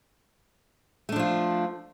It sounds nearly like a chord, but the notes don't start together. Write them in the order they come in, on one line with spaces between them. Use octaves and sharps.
A3 D4 F3 F4